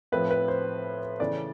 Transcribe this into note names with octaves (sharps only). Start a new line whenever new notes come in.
A2 F3 A3 C4 B4
B4
C5
C#3 E3 A3 D5